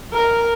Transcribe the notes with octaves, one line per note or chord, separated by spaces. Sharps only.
A#4